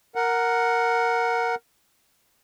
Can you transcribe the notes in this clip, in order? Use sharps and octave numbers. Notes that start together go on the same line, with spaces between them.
A#4 F#5